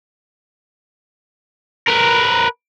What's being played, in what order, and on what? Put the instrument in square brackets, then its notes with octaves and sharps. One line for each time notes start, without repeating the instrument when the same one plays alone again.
[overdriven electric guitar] A#4 B4